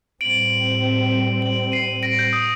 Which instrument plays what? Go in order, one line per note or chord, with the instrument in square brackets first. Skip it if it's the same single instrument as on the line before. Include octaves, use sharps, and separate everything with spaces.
[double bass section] A2 G3 C4 [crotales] D7 F#7
[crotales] D7 F#7
C7 D#7
A#6 D7
G6
D#6